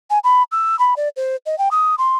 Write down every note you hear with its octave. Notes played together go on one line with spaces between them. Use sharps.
G#5
B5
E6
B5
D5
C5
D#5
G5
D#6
C6